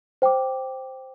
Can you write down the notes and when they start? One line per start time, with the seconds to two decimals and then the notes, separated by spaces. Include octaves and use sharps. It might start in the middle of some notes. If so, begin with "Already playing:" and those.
0.22 C5 G5 D6